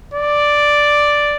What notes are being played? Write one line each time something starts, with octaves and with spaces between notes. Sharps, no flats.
D5